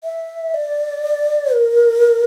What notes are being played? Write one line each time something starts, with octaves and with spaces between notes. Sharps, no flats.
E5
D5
A#4